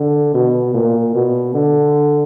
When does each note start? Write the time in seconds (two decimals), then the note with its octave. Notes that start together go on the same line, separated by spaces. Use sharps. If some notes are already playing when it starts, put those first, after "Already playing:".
Already playing: D3
0.34 B2
0.74 A#2
1.15 B2
1.54 D3